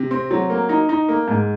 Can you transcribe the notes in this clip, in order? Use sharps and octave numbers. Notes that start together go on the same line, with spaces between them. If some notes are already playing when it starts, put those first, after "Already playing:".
Already playing: C3
C4
F#3
A#3
D#4
D#4
A#3
G#2